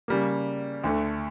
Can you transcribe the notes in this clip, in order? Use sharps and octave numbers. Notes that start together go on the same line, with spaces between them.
C#3 G3 A#3
D2 D3 A3